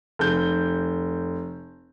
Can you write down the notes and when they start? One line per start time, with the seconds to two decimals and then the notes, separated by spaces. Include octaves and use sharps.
0.19 F1 G6